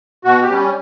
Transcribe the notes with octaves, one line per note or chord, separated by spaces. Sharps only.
B2 F#4
G4
G3 C#4